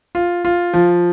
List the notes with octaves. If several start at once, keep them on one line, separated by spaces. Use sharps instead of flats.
F4
F4
F3